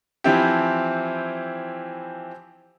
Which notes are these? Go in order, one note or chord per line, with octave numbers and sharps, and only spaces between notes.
E3 F3 C4 E4 G4